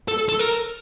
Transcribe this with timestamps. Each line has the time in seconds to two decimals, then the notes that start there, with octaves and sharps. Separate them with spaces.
0.08 A4
0.29 A4
0.39 A#4